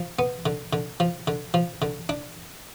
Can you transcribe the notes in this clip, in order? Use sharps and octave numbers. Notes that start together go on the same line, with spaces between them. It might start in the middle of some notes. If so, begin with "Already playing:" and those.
Already playing: F3
B3
D3
D3
F3
D3
F3
D3
D4